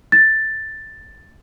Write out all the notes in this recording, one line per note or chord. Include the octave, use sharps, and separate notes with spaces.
A6